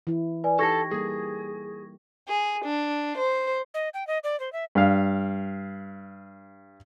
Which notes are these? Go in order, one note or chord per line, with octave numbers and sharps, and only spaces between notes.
E3 E4
B4 D5 G#5
D#4 G4 A4 A5 C#6 G#6 A#6
G3 A#3 G#4 A4
G#4
D4
C5
D#5
G5
D#5
D5
C5
E5
G2 F5